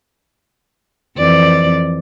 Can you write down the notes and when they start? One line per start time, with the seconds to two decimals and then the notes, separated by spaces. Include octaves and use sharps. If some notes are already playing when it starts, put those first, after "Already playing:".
1.17 F2 E3 D5